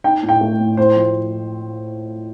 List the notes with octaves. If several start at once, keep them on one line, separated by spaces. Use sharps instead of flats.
D#4 G5
A2
G5
A3
A2
A2 C5
F3